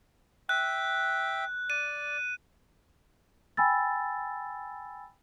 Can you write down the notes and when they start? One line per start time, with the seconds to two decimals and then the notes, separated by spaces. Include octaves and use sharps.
0.49 E5 G5 F#6
1.70 D5 D#7
3.57 G5 G#5 B5 E6 A6